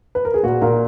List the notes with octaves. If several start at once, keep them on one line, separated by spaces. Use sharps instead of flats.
B4
A#4
G#4
A#2 F#4
A#2 A#4